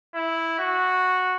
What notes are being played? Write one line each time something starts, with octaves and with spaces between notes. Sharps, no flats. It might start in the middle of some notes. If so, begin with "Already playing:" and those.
E4
F#4